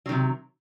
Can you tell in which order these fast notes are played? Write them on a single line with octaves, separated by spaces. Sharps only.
F#3 D#3 C3